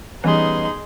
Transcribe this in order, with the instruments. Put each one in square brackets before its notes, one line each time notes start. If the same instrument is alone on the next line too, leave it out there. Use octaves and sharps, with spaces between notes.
[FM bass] E3 [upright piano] G3 B3 C#4 [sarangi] D#4 [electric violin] G#4 C6